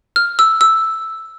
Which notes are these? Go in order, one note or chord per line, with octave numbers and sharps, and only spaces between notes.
F6
E6
E6